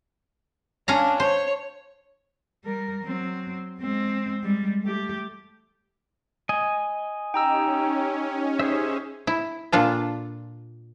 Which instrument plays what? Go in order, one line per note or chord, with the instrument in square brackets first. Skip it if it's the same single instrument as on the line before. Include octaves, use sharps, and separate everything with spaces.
[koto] C#4 F5 A#5 [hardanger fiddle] D4
[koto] C5 [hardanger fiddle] C#5
[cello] G3 A#4
F#3 C4
G#3 C4
G3 G#3
A3 G4
[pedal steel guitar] D#5 G#5
[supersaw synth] C#4 [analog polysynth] D#4 G4 [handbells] G5 A#5 E6
[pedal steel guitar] G#4 C5 E5
[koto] E4
A#2 D4 F4 A4